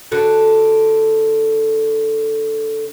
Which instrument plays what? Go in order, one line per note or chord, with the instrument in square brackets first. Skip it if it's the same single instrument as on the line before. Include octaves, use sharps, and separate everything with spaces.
[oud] D3 F#4 A4